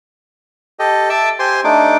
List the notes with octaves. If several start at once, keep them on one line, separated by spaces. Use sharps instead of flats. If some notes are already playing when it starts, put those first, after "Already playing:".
G4 A4 D#5
E5 A5 D6 E6
G4 C5 G#5 C6
A3 D4 D#4 D6